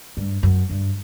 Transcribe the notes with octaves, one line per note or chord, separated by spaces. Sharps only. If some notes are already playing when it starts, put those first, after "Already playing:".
G2
F#2
G2